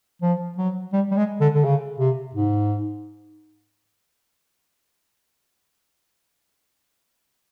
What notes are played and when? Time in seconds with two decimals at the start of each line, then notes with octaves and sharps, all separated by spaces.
0.22 F3
0.58 F#3
0.93 G3
1.11 G3
1.17 G#3
1.41 D3
1.55 D3
1.64 C#3
1.99 C3
2.35 G#2